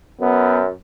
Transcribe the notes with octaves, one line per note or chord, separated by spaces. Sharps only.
F#2 B3